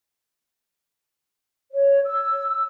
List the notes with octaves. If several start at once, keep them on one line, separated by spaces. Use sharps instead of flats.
C#5
E6